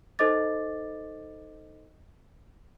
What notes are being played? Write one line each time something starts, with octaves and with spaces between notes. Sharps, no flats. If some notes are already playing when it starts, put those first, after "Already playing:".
D#4 A4 C5 D#5 D6 A6